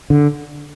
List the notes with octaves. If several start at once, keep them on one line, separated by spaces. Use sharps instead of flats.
D3